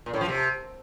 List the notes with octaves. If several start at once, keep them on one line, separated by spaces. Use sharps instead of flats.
A#2
A2
F3
C3